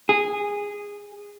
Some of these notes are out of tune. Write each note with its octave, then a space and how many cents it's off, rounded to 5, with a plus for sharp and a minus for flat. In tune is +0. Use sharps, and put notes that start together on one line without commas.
G#4 -15